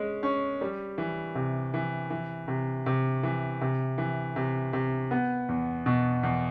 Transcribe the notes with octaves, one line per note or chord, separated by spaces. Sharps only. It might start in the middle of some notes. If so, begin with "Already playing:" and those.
Already playing: G#3 C#4
C#4
G3
E3
C3
E3
E3
C3
C3
E3
C3
E3
C3
C3
B3
E2
B2
E2